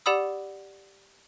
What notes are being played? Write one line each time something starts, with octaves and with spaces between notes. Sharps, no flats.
G4 D5 F#5 B5 D#6 E6